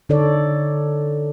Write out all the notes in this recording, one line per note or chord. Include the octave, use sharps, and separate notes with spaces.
D3 D#4 A4 C#5 D5